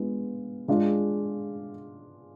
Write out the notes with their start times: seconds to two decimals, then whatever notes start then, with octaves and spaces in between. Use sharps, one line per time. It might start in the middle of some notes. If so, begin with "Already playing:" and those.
Already playing: G#3 B3 D4 F4
0.68 G#3 D4 F4 G#4